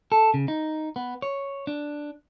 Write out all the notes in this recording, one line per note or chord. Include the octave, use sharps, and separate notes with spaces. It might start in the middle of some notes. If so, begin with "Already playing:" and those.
A4
C#3
D#4
B3
C#5
D4